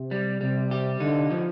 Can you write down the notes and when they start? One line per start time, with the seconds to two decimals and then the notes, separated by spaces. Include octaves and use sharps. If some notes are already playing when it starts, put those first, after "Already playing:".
Already playing: C3
0.11 G3
0.41 C3 G3
0.71 G4
1.00 D3 D#4
1.31 F3